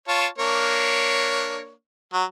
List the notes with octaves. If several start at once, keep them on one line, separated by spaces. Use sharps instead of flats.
F4 C#5 A5
A#3 D4 C#5
F#3